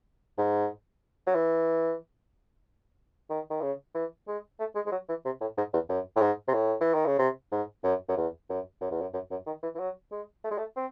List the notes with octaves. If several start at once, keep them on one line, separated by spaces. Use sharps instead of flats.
G#2
F#3
E3
D#3
D#3
C#3
E3
G#3
A3
G#3
G#3
F#3
E3
C3
A2
G#2
E2
F#2
A2
G#2
C3
A2
E3
D#3
C#3
C3
G#2
F#2
F#2
E2
F#2
F#2
E2
F#2
F#2
F#2
D#3
E3
E3
F#3
G#3
A3
G#3
A3
C4